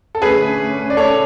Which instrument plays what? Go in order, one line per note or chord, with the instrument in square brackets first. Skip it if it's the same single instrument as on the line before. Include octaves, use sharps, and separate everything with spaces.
[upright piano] A4
[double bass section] D3 A3 C#4 [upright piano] G#4 B4
[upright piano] D5
A4 C#5